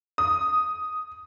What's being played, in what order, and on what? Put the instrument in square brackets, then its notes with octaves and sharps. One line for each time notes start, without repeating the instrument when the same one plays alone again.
[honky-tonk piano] D#6